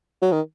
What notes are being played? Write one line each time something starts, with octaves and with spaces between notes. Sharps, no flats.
F#3
D#3